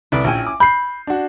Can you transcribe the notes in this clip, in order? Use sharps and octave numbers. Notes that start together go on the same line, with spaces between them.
C2 A4 B4 D5
A#1 C#4 E4 G5 G#5
D6
B5 G6 C7
D4 F#4